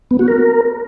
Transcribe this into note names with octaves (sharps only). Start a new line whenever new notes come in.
B3
F#4
A#4